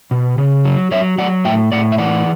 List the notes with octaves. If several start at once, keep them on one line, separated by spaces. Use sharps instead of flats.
B2
C#3
F#3
F#3 C#5 E5
F#3 D5 F#5
A2 E5 G5
A2 D5 F#5
E5
E3 D5 F#5